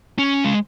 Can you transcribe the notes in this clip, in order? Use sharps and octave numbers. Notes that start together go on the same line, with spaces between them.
C#4
G#3